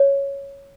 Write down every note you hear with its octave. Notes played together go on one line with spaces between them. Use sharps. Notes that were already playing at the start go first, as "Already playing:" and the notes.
Already playing: C#5